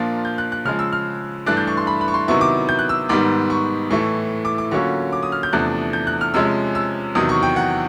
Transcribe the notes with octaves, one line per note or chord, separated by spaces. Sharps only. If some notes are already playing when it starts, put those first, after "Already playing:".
Already playing: A#2 F3 A#3 D4 F4
G6
F#6
F#6
C#3 F3 G#3 F6
E6
F6
G2 E3 A3 D4 F#6
G6
C#6
C6
B5
B5
C#6
C6
C3 D#3 F#3 B3 E4 C#6
D6
G6
F#6
E6
G#2 D#3 G3 B3 D6
C#6
A2 E3 A3 C#6
D6
D6
D3 F#3 A#3 C#4 F4 C#6
D6
D#6
F6
G6
E2 C3 F3 A3 D4 F#6
G6
F#6
F6
C3 F3 G#3 C#4 E6
E6
E2 C3 D#3 F#3 D#6
C#6
G5
F#5